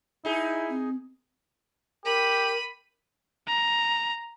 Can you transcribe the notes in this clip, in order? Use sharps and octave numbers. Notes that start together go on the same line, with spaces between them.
D#4 E4 G#4
C4
G4 A#4 B5 D#7
A#5